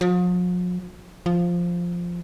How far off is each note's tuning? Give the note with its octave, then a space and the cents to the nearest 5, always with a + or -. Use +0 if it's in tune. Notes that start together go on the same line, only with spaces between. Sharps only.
F3 +45
F3 +0